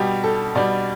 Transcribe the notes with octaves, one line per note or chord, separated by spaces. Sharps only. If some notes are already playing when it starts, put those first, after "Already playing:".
Already playing: B2 G3 G4
A4
B2 G3 D5